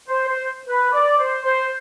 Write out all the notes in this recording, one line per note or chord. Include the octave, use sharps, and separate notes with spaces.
C5
C5
B4
D5
C5
C5